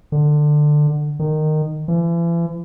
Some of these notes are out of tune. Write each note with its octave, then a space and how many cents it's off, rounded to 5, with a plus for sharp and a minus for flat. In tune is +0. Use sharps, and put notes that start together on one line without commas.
D3 +20
D#3 -15
E3 +40